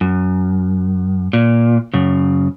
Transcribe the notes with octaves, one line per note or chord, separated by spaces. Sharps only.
F#2
A#2
F#2 C#3